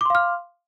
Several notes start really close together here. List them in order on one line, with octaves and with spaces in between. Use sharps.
D6 C6 F5 F6